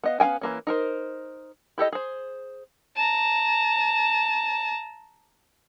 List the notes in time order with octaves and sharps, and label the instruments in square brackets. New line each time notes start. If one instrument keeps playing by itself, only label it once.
[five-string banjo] B3 D#5 F5
B3 C#4 F5 G5 G#5
E3 A#3 C#4
D#4 A#4 C5
E4 G4 A4 D#5
G#4 C5
[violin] A5 A#5